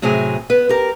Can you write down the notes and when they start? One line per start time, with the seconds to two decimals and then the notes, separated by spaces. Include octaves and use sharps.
0.02 A2 C3 F#3 C4 G#4 G#5
0.50 B3 B4
0.69 G4 A#4